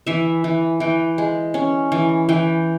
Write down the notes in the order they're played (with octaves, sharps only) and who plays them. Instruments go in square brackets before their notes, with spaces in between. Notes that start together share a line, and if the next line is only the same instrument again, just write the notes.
[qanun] E3 E5
E3
E3 G5
G#3
C#4
E3
E3 G5